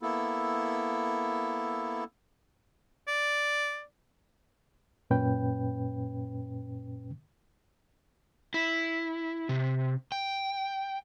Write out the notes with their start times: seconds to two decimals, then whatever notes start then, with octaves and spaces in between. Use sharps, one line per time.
0.02 A#3 B3 E4 A4
3.08 D5
5.10 F#2 A#2 C#4 B4 G5
8.54 E4
9.49 C3
10.12 G5